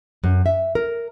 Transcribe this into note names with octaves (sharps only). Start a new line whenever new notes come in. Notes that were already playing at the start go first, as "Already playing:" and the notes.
F#2
E5
A#4